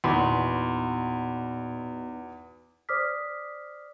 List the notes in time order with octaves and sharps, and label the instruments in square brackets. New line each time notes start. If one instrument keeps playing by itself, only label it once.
[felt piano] E2 [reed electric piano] A#2 B5 C6 [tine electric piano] B3 D#4 F#4
[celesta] C5 D5 D6 D#6 F6 B6